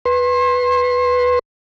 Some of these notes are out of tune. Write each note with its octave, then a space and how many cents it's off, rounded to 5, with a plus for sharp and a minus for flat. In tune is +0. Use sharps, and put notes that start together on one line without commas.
B4 +0 C6 +30